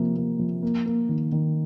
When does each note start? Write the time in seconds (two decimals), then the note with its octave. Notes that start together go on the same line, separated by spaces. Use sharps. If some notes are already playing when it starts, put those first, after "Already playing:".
Already playing: C3 F3 A#3
0.16 A#3
0.39 F3
0.63 A#3
0.86 A#3
1.09 D#3
1.32 D#3